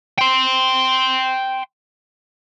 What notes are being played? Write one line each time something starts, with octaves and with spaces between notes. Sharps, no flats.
G5 C6